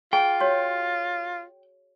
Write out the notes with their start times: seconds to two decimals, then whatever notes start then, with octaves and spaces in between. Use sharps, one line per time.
0.13 F4 G#4 G5
0.40 F#4 C#5